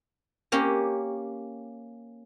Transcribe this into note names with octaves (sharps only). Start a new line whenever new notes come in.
A#3 C#4 G4